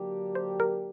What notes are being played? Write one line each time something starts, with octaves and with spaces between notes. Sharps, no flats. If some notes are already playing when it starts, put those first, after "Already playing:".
Already playing: D3 F#3 A#3 D4 G4
C5
A#4